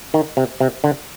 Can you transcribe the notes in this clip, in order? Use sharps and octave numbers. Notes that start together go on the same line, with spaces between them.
D#3
C3
C3
D3